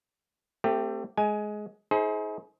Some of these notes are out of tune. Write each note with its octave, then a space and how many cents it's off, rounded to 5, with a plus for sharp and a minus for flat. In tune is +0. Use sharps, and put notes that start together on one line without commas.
A3 +25 C4 +0 G4 +0
G#3 +15 G#5 +15
D#4 +45 G#4 +30 C5 +5